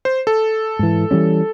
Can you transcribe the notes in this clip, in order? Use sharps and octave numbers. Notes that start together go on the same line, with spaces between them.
C5
A4
G#2 E3
E3 G3 C#4